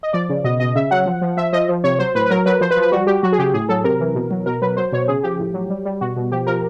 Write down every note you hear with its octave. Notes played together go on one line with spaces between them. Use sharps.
D#5
F3 D5
C#3
B2 D#5
B2 D#5
C#3 E5
F#3 F#5
F3
F3
F3 E5
F3 D#5
F3
C3 C#5
F#3 C5
A2 B4
B4
F#3 A#4
F#3 B4
F3 C5
B4
F3
B4
G3 F#4
G3 G4
F#3 F#4
G#4
C#3 G4
A2 G#4
F#3 A4
C3 A#4
E3
B2
F#3
B2 A#4
F#3 B4
F#3 C5
B2 C#5
C#3 G#4
F3 G4
A2
F#3
G3
G3
B2 F#4
B2
F3 G4
F3 A#4